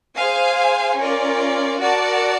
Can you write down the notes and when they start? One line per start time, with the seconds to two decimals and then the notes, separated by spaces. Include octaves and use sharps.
0.16 G#4 C5 F5 G#5
0.98 C#4 F4 A#4 D5
1.81 F#4 A#4 D5 F#5 A5